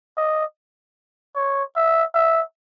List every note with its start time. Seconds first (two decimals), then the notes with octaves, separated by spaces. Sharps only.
0.17 D#5
1.36 C#5
1.76 E5
2.14 E5